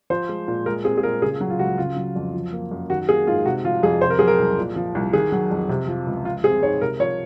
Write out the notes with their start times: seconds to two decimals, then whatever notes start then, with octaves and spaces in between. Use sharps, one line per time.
0.10 F3 C5
0.29 G#3
0.48 A#2
0.66 G#3 A#4
0.84 C4 G#4
0.98 G#4
1.03 A#2 A#4
1.22 C#3 G#4
1.41 F#3
1.50 F4
1.59 C#2 F#4
1.78 C#3 F4
1.96 F#3
2.16 F2
2.34 F3
2.53 A#3
2.71 F#2
2.90 D#3 F#4
3.08 A#3 G#4
3.27 G#2 F4
3.46 C3 F#4
3.65 F3 F4
3.83 F2 G#4
4.01 C3 C5
4.10 A#4
4.19 F#3 G#4
4.28 A#4
4.39 C2
4.58 A#2
4.76 F3
4.95 C2
5.13 D#3 G#4
5.32 F#3
5.51 F2
5.69 C3
5.88 F3
6.07 C#2
6.25 F3 F4
6.44 C4 G#4
6.63 G#2 C#5
6.81 C3 A#4
7.00 F3 C#5